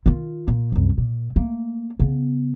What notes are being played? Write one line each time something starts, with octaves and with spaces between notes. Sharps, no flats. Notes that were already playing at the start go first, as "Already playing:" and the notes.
D#3 F4
A#2
C2 F#2
A#2
A3 A#3
C#3 B3